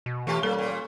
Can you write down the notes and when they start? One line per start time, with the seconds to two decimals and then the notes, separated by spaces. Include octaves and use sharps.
0.06 B2
0.27 E3 A3 C#4 F4 G4
0.43 G3 A#3 A4
0.58 A#2